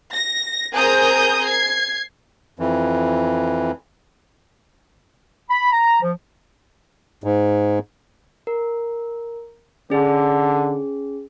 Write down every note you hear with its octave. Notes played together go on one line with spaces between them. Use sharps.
A#6
C4 G#4 A#4 A#5 D#6 G6
G#6 C7
F2 E3
B5
A#5
F3
G#2
A#4
D3 C#4 G#4